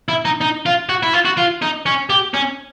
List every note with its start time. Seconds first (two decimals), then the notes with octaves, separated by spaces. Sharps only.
0.09 E4
0.25 D#4
0.41 D#4
0.66 F4
0.89 F#4
1.03 E4
1.14 F4
1.25 F#4
1.38 F4
1.62 D#4
1.86 C#4
2.10 G4
2.34 C#4